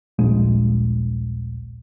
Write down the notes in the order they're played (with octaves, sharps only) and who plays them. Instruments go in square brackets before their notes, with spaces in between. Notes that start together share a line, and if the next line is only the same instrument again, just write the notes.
[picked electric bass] D#1 A#1 G#3